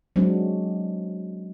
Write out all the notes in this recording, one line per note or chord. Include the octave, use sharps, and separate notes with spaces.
F#3 G#3 C4 D4